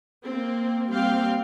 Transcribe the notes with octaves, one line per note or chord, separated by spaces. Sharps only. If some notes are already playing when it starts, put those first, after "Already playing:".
A#3 C4
G3 A#3 C4 F5 G5